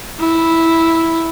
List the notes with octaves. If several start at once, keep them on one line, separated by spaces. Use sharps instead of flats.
E4